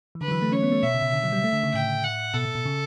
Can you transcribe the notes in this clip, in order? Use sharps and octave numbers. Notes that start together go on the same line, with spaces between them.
E3
D3 B4
F#3
E3
A3
C#4 C#5
B3
A3
B2 E5
C#3
B2
D3
F#3
G3
A3
D3
C#3
A2 G5
F#5
B2 A4
B2
B2
C#3